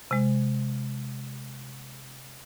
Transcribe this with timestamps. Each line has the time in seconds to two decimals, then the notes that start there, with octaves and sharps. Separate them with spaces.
0.11 C3 G#3